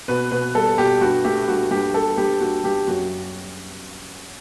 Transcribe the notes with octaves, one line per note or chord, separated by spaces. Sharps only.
B2 B4
B2 B4
G3 A4
B2 G4
G2 F#4
A3 G4
G2 F#4
G2 G4
G2 A4
G2 G4
G2 F#4
G2 G4
F#2 F#4